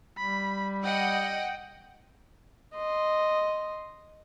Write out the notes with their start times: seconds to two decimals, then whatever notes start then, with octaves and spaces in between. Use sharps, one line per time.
0.18 G3 B5
0.84 D#5 F#5 G5
2.74 D#5 C6